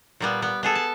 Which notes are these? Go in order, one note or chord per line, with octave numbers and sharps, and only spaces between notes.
A#2 G3 B3
B3
B3 G#4 A4
A5